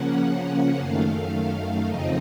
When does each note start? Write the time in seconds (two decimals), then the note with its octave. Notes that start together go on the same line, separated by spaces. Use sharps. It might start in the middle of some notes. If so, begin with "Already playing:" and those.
Already playing: C#3 F3 A#3 C#4 F#5
0.79 F#2 D#3 A3 F5
1.87 F2 C#3 F3 C4 D#4 D#5